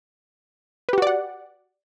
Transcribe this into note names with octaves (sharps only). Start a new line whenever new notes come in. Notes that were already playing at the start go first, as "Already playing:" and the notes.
F#4 G4 B4 D5 F#5